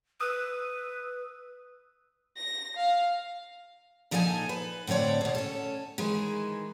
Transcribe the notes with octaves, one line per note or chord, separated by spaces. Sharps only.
B4 D#6 E6 F#6
A#6
F5
A#2 F3 D#4 A4 E5 G#5
B4
A2 D3 C4 C#5 D5
D#2 B2
C#4 A4
D#3 E3 G#3